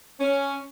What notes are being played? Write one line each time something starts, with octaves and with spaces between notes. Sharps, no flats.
C#4